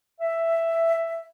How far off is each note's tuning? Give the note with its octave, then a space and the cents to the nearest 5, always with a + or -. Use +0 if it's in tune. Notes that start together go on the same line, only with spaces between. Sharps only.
E5 +5